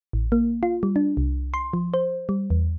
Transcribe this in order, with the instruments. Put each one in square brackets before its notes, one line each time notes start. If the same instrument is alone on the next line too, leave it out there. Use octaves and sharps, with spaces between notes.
[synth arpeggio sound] A1
A#3
F4
G3
D4
C2
C6
F3
C5
G3
E2